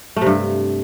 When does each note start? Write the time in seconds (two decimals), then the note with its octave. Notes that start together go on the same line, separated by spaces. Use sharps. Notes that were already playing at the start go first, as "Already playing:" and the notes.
0.16 A3
0.21 C3
0.26 G2